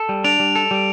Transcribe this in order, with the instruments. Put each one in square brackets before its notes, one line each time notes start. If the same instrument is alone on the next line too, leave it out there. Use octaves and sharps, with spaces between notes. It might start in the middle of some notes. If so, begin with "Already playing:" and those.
Already playing: [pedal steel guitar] A4
G3
[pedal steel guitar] D4 [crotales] D7 F7
[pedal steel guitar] G3
A4
G3